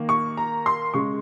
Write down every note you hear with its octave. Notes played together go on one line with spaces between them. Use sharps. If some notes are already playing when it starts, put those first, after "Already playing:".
Already playing: D#3 A#3
C#6
A#5
C6
C#3 G#3 C#6